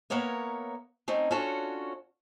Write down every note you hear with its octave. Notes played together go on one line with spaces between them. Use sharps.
A#3 B3 A#4 C#5 E5
A3 C4 C#4 D#4
C#4 D4 F4 F#4 A4 C#5